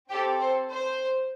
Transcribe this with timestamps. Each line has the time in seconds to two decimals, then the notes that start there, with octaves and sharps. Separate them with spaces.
0.10 C4 G4 A4 G5
0.41 C5
0.70 C5